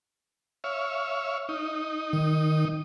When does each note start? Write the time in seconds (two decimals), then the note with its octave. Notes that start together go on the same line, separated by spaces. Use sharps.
0.64 C#5 E5 F5
1.49 D#4
2.13 D#3